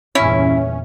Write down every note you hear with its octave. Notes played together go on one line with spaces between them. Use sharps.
G1 E2 A#2 C#4 E4